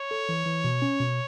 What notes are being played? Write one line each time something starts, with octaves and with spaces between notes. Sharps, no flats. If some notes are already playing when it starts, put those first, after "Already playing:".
Already playing: C#5
A4
E3
E3
B2
C#4
B2